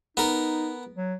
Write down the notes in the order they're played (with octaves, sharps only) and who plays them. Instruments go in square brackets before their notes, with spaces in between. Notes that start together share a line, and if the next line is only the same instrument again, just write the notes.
[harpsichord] B3 A#4 [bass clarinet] D#4
[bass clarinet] F#3